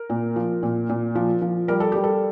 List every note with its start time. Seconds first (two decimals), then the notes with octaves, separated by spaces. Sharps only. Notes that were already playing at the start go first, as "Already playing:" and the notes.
Already playing: A#4
0.10 A#2
0.36 F3
0.63 A#2
0.89 A#2
1.15 F3
1.42 F3
1.68 G3 A#4
1.80 A4
1.92 G3 G4
2.04 A4